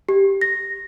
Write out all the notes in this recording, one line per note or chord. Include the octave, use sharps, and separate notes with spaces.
G4
A#6